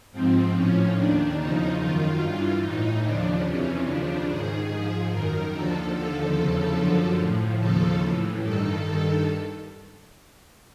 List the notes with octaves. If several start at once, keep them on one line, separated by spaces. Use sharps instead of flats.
G#2 F3 C4
A2 F3 C#4
D#2 D#3 D4
E2 C#3 F3 D#4
F#2 D#3 F4
G2 E3
A2 E3 D#4
D#2 C#3 F3 D4
F2 C3 E3 C#4
D#2 C#3 F3 D4
G#2 D#3 G#4
G#2 F3
F#2 D#3 A#4
D#2 D3 F3 A4
D#2 D3 F3 A4
E2 C#3 F3
F#2 D3 F3
A2 F3
D#2 C#3 F3 A4
A2 E3
G2 D#3 A4
G2 D#3 A4